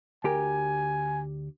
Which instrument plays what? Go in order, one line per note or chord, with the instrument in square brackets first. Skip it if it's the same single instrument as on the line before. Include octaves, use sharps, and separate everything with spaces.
[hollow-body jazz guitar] D2 G4 A#4 [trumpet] G#5